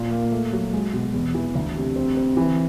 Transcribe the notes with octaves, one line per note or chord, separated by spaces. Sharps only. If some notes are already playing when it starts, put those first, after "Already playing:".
Already playing: A#2
A#3
A3
F#3
G#3
B2
E2
E3
D2
C3
C4
C4
E3